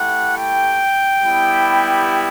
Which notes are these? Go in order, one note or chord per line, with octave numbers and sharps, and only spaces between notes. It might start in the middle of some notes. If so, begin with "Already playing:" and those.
Already playing: A3 E4 G4 F#5
G5
G3 B3 E4 G4